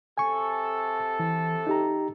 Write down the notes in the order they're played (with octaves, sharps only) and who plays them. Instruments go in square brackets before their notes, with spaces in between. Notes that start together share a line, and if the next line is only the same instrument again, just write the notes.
[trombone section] C3 A4 [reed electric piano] G#5 C#6
[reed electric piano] E3
D#4 G4 A#5